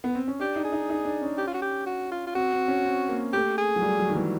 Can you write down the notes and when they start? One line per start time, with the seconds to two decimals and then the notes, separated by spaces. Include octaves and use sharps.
0.04 B3
0.15 C4
0.28 C#4
0.40 D4 G4
0.56 D#4
0.64 G#4
0.72 D#4
0.90 D#4
1.05 D4
1.21 C#4
1.38 G4
1.47 F4
1.54 F#4
1.62 G4
1.86 F#4
2.12 F4
2.27 F4
2.35 C4 F#4
2.52 C4
2.68 C#4
2.85 C4
3.08 A#3
3.33 A3 G4
3.58 G#4
3.76 F#3
3.82 G3
3.99 F#3
4.09 D#3
4.15 E3